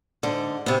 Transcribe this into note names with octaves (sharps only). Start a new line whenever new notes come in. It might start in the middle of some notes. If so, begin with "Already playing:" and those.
G#2 D3
C3 B3